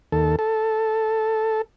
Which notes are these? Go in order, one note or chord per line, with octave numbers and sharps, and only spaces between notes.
D#2 A4
A4